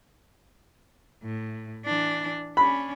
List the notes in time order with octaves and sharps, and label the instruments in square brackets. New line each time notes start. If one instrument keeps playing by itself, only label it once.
[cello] A2
E3 D4
[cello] C#4 D4 [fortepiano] B5